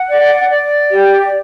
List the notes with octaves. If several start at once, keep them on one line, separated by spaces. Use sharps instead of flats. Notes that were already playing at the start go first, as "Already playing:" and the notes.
Already playing: F#5
D5
D5
G4